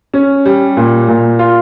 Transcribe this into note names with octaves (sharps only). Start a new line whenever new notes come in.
C#4
G3
A#2
A#2
F4